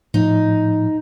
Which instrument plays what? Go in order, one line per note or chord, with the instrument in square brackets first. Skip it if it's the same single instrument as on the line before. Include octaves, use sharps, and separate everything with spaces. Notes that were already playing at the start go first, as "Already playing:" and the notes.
[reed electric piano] A2 F3 [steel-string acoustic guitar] D#4